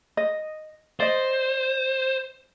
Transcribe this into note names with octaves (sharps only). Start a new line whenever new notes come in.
D#5
C5 D5 D#5